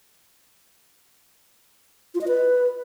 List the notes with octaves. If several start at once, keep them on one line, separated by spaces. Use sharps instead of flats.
F4
D#5
B4